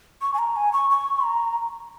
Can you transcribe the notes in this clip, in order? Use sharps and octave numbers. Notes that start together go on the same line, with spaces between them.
C#6
G#5
A#5
G#5
C#6
C#6
A#5